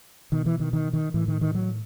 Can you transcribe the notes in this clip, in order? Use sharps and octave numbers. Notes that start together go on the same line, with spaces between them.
B2 D#3
E3
D#3
D#3
D#3
A2 E3
D#3
D#3
F#3